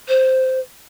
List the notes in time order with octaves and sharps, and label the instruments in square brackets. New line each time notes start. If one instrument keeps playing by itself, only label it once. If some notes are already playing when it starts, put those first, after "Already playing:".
[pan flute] C5